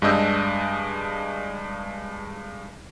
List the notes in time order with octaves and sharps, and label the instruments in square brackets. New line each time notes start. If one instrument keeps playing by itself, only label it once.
[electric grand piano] G2 G#3 D4 D#5 E6 G6